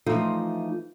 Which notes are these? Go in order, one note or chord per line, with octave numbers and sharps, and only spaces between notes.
E3 F3 A3 D#4 F4